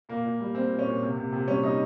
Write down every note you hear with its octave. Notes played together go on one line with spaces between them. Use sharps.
A#2 A#3
A#2
G3
G3 C4
A#2
C#4
A#2
C3
C3
C3
G3 C#4
G3 D#4